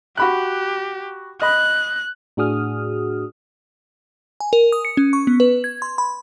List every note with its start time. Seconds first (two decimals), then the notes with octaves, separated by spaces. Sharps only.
0.17 F#4 G4 B5 F#6
1.42 D#5 B5 F#6
2.37 A2 D4 F#4 G#4 D#6 F6
4.40 G#5
4.53 A#4
4.72 D#6
4.85 C#7
4.97 C#4
5.13 C#6
5.27 B3
5.40 B4
5.64 G#6
5.82 C6
5.98 B5